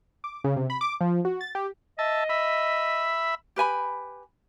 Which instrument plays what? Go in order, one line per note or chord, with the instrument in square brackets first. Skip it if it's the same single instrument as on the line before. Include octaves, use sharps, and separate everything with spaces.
[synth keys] D6
C#3
C3
B5
D6
F3
F#4
A6
G4
[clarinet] D#5 [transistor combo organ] E5 A5
[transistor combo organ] E5 B5
[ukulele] G4 B4 G#5 B5